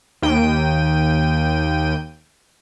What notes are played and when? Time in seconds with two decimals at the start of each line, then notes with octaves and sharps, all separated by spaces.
0.22 D#2 G5 D#7